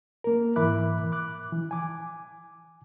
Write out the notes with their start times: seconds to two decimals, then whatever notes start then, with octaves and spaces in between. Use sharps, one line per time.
0.24 A#3 A#4
0.56 G#2 E3 E5 B5 D6 F#6
1.12 D6 F#6
1.52 E3
1.71 G#5 D6